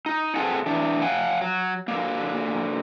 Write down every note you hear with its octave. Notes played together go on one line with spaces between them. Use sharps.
D#4
C4 G#4 A4 F#5 G#5
E3 D4
F5 F#5 G#5
F#3
D3 A#3